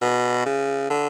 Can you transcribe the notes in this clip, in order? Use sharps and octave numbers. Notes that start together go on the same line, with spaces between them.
B2
C#3
D3